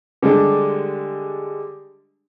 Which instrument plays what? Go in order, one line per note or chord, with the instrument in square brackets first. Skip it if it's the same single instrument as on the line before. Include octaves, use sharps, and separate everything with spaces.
[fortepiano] D3 G3 G#3 D4 G4